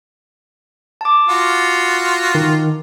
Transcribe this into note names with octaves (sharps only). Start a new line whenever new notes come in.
A5 D6
F4 F#4
D#3